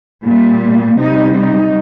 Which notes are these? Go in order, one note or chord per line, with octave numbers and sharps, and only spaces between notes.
A#2 G3
C3 G3 D#4
D#4